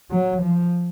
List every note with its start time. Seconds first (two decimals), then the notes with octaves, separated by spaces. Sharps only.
0.11 F#3
0.42 F3